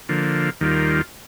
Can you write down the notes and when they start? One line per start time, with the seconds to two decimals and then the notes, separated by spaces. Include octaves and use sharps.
0.09 D3 F3 A#3
0.61 D#2 D#3 G3 A#3 F4